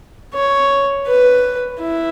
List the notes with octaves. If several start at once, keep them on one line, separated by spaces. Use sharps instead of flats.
C#5
B4
E4